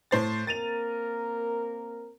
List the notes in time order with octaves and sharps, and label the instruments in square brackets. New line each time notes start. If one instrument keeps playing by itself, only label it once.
[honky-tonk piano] A2 C5 A6
[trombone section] A#3 C4 A#4 [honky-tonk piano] A6 D#7 F7